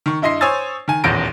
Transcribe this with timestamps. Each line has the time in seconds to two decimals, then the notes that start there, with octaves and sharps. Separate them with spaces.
0.06 D#3 C#6
0.22 G2 E4 D#5 C6 C7
0.41 C5 C#5 G#5 D#6 E6 A6
0.88 D#3 G#5
1.04 D#1 A1 E2 G6 A#6 D7